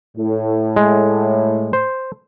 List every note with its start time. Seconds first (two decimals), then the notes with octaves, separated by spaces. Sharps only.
0.17 A2
0.76 G#3
1.73 C5